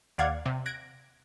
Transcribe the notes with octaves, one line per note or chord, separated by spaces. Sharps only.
D#2 D5 F5 F#5 G#6
C3
F#6 G#6 A#6 D7